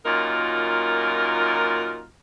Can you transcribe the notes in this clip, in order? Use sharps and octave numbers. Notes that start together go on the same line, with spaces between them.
F#2 A#2 D#4 F4 A#4